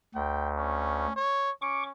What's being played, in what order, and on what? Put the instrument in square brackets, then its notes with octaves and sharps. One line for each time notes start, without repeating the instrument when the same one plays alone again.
[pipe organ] D2 [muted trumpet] G5
[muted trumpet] C#4
C#5
[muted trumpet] C#4 [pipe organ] C#6 D6